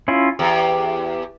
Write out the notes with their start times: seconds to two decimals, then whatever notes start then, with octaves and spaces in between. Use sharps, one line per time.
0.08 C#4 E4 F4
0.39 E2 G4